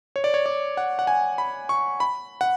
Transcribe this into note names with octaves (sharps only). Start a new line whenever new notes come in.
C#5
D5
C#5
D5
F#5
F#5
G#5
B5
C#6
B5
F#5